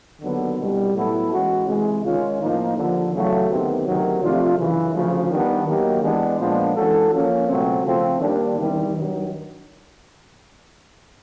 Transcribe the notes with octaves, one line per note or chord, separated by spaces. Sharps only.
D#2 D3 F#3 B3
C2 B2 G3
A2 F#3 B3 E4 A4
E3 G#3 C#4 F#4
C3 E3 G#3
D#3 G#3 C#4 F4
A2 F3 A#3 D#4
D#2 D3 F3
E2 C#3 F#3 A3
D2 C3 D#3 F#3 B3
D2 C3 D#3 F#3
C3 F3 A3 D4 F4
F#2 C#3 E3
D2 C#3 F3
D#3 G3 B3 D4
D#3 F#3 A#3 D#4 G4
E3 G#3 B3 D4
A#2 F3 G#3 B3 D4
E3 G#3 C#4 F#4 A4
F3 A#3 C#4
C#2 B2 F#3 A3 C4
C#3 F3 A3 C4
D#3 G3 A#3 D4
E2 C3 D#3 G3
G2 D#3 F#3